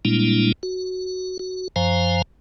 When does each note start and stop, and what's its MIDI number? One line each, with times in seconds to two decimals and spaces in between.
0.05 0.52 46
0.05 0.52 55
0.05 0.52 56
0.05 0.52 58
0.05 0.52 62
0.05 0.52 64
0.63 1.37 66
1.39 1.68 66
1.76 2.22 42
1.76 2.22 53
1.76 2.22 72
1.76 2.22 77
1.76 2.22 80
1.76 2.22 82